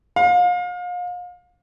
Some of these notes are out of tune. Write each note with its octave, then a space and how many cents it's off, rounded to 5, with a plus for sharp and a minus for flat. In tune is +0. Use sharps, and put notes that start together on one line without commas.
F5 +35